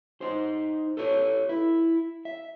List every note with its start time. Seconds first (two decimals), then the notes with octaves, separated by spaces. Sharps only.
0.21 D#4 C5
0.97 A4 B4 C#5
1.49 E4
2.25 E5